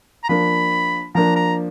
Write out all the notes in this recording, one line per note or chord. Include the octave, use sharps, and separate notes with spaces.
A#5
F3 A#3 D4 B5
F3 A#3 D4 A#5
A#5